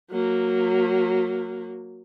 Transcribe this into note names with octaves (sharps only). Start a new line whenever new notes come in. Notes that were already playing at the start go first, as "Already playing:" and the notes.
F#3 A#3